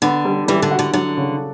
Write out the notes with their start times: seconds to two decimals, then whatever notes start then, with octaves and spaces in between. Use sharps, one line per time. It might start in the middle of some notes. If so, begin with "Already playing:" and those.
0.02 D3 B3
0.25 G3
0.48 E3 G3
0.62 D3
0.71 F#4
0.79 D3
0.93 D3 F#3
1.17 C#3